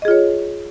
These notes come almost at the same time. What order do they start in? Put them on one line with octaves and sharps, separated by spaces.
D#5 G#4 F4 C#5